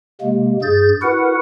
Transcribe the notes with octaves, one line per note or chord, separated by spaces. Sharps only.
C3 G#3 A#3
G2 G#4 G6 A6
E4 F#4 A#4 B4 F#5